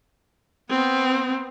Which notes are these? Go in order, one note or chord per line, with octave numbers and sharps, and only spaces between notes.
B3 C4